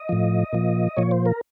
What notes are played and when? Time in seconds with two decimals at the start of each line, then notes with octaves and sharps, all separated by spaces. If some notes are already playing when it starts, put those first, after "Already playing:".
Already playing: D#5
0.09 A2 F3
0.53 A#2 F3
0.97 A#2 F3 C#5
1.11 C5
1.26 A#4